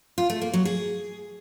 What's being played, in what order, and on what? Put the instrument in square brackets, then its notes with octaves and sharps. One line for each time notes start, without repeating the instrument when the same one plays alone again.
[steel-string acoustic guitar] F4
A3
A#3
F#3
G#4